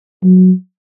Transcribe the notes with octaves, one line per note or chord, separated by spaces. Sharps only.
F#3